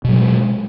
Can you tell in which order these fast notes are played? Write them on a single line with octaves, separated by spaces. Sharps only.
B2 F#3 G#3